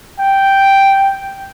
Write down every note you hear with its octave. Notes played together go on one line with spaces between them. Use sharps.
G5